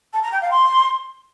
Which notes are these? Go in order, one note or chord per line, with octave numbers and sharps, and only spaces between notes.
A5
A#5
G5
F5
C6